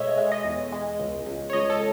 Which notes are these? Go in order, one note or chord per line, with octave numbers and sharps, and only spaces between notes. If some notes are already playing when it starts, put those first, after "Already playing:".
Already playing: B2 G#3 A4 C#5 D#5 E5
G#3
D#5
E2
G#3
C#2
C#2
C#5
C#2 D#5
A4